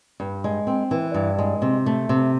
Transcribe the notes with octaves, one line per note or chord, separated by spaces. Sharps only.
G2
G#3
C4
E3
G2
G#3
C3
A3
C3